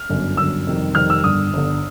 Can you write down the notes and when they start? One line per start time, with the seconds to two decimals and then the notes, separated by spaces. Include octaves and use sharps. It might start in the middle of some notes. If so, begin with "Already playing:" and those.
Already playing: F6
0.09 G1 F#2 D3
0.37 G1 F#2 D3 E6
0.67 F2 C3 D#3 G3
0.95 F2 C3 D#3 G3 F6
1.10 E6
1.24 G1 G2 D3 D#6
1.53 G1 G2 D3